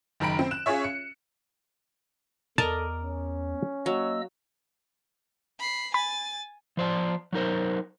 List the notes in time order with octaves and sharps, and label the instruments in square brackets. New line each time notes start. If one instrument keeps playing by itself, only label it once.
[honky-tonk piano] F#1 D#3 A#5 B5 D7
C4
F#6 E7
C#4 F4 G#4 C#5 E5
C#7
[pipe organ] E2 [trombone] A4 [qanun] A#4 D5 D#5 [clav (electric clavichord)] A5
[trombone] C#4
[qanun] F#3 [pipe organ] A#3 D#5 E6
[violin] B5 C7
[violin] G#5 A6 [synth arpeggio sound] B5
[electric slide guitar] F3 C5 D5 A5
F#3 D#4 A#4 C5